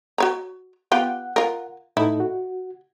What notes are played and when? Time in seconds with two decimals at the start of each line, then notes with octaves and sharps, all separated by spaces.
0.18 F#4 C#5 A#5
0.92 B3 F4 G4 F#5
1.36 F4 A#4
1.97 A2 D#4 E4 A4
2.20 F#4